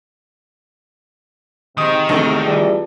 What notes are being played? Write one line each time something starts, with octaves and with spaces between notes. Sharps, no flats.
G#2 C3 D#3 D#5 G5 C6 D#6
G#1 E2 G#2 C3 A3 D#4 C#6
E3 G3 F4 G#4 A5